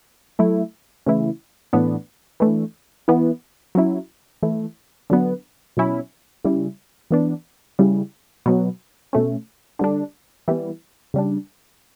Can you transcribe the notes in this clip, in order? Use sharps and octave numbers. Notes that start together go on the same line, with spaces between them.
F#3 A3 E4
C#3 E3 A3 E4
A2 E3 B3 D4
E3 A3 D4
E3 B3 E4
F#3 C#4 E4
E3 A3 E4
D3 F#3 B3 D4
B2 F#3 C#4 E4
C#3 G3 C#4 E4
E3 B3 D4
C#3 G3 C#4 E4
B2 F#3 B3
B2 A3 C#4
D3 G3 D4
E3 G3 B3
C#3 G3 D4